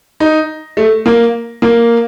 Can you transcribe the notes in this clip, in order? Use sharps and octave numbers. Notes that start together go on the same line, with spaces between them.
D#4
A3
A#3
A#3